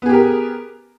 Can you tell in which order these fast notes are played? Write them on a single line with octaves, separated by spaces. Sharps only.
B3 G#4 G4 A#4